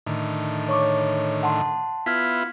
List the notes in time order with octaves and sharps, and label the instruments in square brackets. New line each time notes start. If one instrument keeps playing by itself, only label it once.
[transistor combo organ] A2 D3 D#3
[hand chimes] C#5 C#6 D6
F#5 A5 C6
[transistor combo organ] B3 E4 F4 [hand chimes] F6 G#6 B6